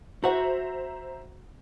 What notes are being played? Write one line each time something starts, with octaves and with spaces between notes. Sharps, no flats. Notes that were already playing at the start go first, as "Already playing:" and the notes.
F#4 C5 E5 F#5 A#5